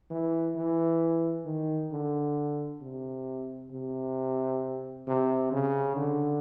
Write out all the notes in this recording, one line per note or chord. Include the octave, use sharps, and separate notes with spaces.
E3
E3
D#3
D3
C3
C3
C3
C#3
D3